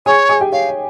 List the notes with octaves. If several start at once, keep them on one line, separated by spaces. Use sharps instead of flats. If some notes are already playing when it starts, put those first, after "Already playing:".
G#4 C#5 G#5
G#4 G#5
G4 G5
C#5 F5
C#5